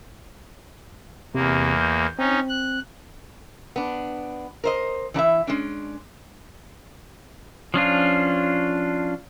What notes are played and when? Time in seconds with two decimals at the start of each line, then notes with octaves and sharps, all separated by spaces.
1.35 E2 C3 A#3
1.81 G6
2.19 C4 C#4 D#4
2.49 F#6
3.76 B3 D4
4.64 A#4 C5 D#5
5.14 E3 D4 E4 E5
5.47 G#3 C#4 D4
7.74 F3 C#4 D4 F4